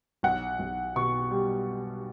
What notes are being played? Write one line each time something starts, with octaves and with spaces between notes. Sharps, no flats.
B1 F#5
B1
B2 C#6
G3